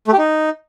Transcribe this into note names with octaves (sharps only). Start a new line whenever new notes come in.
A3
G4
D#4